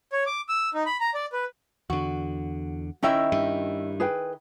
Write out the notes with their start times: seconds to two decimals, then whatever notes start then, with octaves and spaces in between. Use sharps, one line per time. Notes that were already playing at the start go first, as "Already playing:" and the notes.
0.13 C#5
0.26 D6
0.49 E6
0.74 D#4
0.86 B5
1.00 A#5
1.14 D5
1.33 B4
1.90 E2 D3 F#4
3.03 D#3 C#4 E4 D#5 E5 G5
3.32 G2
4.00 G#4 B4 G5